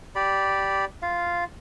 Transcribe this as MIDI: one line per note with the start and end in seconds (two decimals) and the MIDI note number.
0.15 0.85 67
0.15 0.85 74
0.15 0.85 83
1.02 1.44 65
1.02 1.44 77